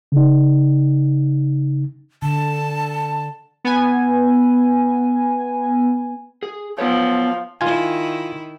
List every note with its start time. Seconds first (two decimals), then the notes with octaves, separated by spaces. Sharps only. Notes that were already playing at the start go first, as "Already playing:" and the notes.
0.12 C#3 D#4
2.22 D3 A5
3.64 B3 G#5
6.43 G#4
6.78 F3 B3 B4 C#5
7.61 D#3 E4 F4 G#5